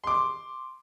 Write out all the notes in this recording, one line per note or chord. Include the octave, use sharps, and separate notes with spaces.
C6 D6